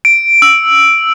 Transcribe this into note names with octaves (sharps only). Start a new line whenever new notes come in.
D7
E6